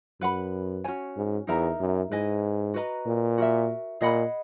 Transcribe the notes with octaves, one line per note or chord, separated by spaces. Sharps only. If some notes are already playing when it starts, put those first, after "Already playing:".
F#2 B4 F#5 B5
C#4 F#4 C#5 G#5
G#2
E2 D#4 A#4 E5 A#5
F#2
G#2 E4 B4 D#5 G#5
F#4 B4 D#5 A#5
A#2
F#4 A#4 E5
A#2 G#4 D#5 F#5 B5